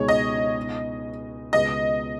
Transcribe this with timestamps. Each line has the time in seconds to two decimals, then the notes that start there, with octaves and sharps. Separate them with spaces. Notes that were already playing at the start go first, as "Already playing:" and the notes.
Already playing: C#2 B2 G#3 D#4 G#4 C#5
0.08 D#5
1.53 C#2 B2 G#3 B3 D#5